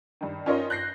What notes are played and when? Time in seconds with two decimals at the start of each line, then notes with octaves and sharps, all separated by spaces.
0.21 G2 D#3
0.46 C#4 D#4 F4 A#4 C#5 D#5
0.70 F#6 G6 A#6 C7